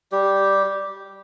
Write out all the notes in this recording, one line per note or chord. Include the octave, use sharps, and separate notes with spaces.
G3 G4